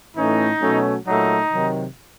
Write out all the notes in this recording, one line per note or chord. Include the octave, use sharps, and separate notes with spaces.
A2 E3 A3 C#4 D#4
B2 F#3 A3 C#4
A#2 F#3 A3 D#4
C3 D#3 F#3